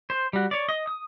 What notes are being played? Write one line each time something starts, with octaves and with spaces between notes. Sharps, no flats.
C5
G3 F#4
C#5 D5
D#5
D#6